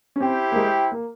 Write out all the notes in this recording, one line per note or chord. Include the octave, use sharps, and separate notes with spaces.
C#4
C4 E4 G4 C5 G5
A#3
G#3
A#3